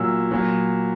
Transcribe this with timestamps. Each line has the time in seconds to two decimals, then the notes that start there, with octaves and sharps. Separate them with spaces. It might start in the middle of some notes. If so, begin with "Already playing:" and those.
Already playing: A#2 F#3 E6
0.31 A#2 F#3